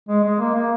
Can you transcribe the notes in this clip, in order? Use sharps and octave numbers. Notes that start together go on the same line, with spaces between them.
G#3
G#3
A#3
A#3